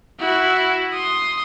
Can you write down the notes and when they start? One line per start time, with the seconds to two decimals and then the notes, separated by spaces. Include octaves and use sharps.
0.19 E4 F#4
0.93 C6 D#6